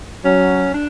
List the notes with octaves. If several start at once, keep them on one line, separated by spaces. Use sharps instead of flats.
F#3 C#4
D4